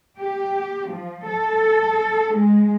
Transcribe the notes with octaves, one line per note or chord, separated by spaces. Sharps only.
G4
F3
A4
G#3